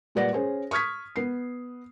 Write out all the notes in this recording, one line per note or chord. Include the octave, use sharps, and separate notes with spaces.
A#2 G3 B4 D5 F#5 A#6
C#4 G#4 C5
C#6 D#6 F6 G#6 B6
B3 C7